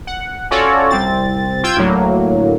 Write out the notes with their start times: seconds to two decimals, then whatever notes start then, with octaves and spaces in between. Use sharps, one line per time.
0.07 F#5
0.51 C#4 F4 F#4 A4 C#5 D5
0.90 C2 C4 A6
1.64 F4 G5 E6 G6 G#6
1.77 D2 A2 F#3 A#3